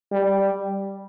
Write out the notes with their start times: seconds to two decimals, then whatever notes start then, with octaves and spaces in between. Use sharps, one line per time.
0.12 G3